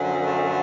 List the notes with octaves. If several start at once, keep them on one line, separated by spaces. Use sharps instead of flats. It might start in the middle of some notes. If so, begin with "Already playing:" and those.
Already playing: F#2 D3 F3
A3